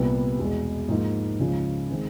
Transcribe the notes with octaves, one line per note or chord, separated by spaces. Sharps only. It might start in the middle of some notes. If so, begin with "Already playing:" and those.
Already playing: C2 A#2 G3 B3
E2 B2 G#3
G#2 F3 A#3 D#4
C#2 C#3 F3 G#3
D#3 G#3 C4